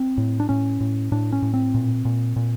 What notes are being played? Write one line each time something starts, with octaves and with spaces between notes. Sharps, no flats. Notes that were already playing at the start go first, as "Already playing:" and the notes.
Already playing: C4
A2
D4
A2 C#4
A2
A2 D4
C#4
A2
C4
A#2
A#2
A#2